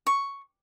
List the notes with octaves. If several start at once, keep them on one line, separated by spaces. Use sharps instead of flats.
C#6